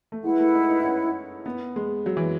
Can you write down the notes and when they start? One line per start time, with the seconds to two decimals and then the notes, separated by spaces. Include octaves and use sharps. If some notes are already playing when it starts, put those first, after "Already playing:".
0.12 A3
0.24 G#3 E4 B4 F#5
0.39 A3
0.54 D#4
0.70 D#4
0.80 D#4
0.85 C#4
1.46 B3
1.76 G#3
2.06 F#3
2.17 E3